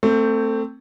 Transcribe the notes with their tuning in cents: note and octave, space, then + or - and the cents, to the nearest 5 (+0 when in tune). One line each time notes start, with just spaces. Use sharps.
A3 +25 C4 +0